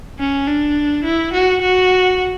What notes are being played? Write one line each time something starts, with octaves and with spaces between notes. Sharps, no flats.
C#4
D4
E4
F#4
F#4